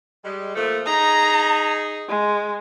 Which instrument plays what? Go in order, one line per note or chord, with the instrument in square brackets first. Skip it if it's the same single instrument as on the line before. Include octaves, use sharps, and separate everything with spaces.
[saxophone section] G3 G#3
A#2 F3 A3
[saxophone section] D#4 G#4 [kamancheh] A#5
[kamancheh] G#3